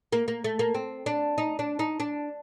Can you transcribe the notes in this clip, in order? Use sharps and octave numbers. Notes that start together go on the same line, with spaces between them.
A#3
A#3
A3
A#3
C4
D4
D#4
D4
D#4
D4